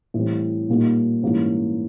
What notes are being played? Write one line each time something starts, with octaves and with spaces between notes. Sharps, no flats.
A2 E3 G3 C4
A#2 G3 A#3 D#4
G#2 E3 G3 A#3 C#4